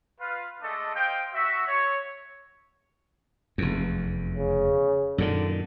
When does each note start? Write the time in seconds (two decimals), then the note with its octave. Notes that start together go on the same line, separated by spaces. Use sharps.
0.20 F4 B4 F5
0.62 G#3 A3 D4 A4 D5 D#5
0.95 C5 D#5 F5 G5
1.34 F#4 E5
1.67 C#5
3.58 F1 E2
4.36 C#3
5.18 F#2 A#2 D3 D#3